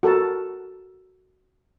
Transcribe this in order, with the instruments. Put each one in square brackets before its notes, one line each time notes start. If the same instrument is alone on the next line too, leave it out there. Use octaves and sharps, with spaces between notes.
[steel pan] F#4 A4 A#4 A5